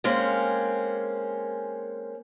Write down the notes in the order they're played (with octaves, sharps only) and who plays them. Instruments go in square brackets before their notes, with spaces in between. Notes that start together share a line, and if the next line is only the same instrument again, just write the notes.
[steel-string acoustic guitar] G#3 A#3 C4 C#4